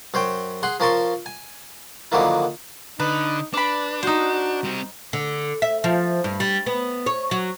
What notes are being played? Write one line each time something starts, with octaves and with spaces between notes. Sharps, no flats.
F#2 C5 C#5 G5
G#4 F#5 C6
F3 C#4 A#4 A5 C6 C#6
G#5
D3 D#3 F3 F#3 A#3 E4
D3 D#4 B4
D4 B4 D5 B5
D#4 F#4 C5
G3 C4
D3
E5
F3
G2
G3
B3
C#5
F#3